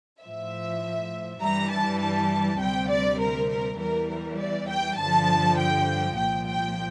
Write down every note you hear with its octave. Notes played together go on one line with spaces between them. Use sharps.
A2 F3 E5
G2 E3 G3 A#5
A5
A5
D2 C3 G3 G5
D5
A#4
A#4
E2 E3 G3 A#4
A#4
D5
G5
G2 D3 F3 A5
G5
C2 A#2 F3 G5
G5